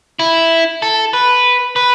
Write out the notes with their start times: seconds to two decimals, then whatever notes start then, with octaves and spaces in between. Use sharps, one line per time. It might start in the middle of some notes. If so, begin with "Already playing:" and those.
0.19 E4
0.82 A4
1.13 B4
1.76 B4